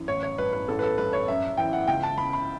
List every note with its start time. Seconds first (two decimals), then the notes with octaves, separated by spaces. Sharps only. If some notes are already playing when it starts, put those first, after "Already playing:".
Already playing: F#2 E3
0.08 A1 C#5
0.23 C#5
0.38 G2 B4
0.53 B4
0.68 A1 A4
0.79 B4
0.83 A4
0.98 G2 B4
1.13 C#5
1.28 F#2 E5
1.57 E3 G5
1.73 F#5
1.88 C#2 G5
2.03 A5
2.18 C#3 B5
2.33 B5